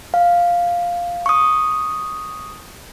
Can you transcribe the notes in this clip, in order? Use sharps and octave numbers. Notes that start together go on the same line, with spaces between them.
F5
C#6 D#6